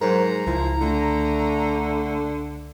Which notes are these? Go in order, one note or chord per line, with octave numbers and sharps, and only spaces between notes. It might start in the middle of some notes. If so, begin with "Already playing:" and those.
G#2 F#3 A#4 C5 A#5
C#2 F3 E4
D3 A3